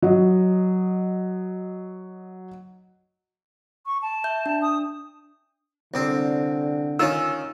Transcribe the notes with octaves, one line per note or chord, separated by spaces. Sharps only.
F#3 D#5
C#6
A5
E5 G6
D4
D#6
C2 D3 C4
D#3 C#4 F4 E6